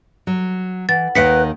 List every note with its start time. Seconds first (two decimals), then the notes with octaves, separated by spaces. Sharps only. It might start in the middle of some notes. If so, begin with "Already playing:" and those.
0.27 F#3
0.89 E3 F#5 A6
1.15 D#2 D#3 B4 F5 B6 C#7